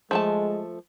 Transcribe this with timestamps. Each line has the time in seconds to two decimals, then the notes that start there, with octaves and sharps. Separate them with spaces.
0.11 F3 G#3 A3 A5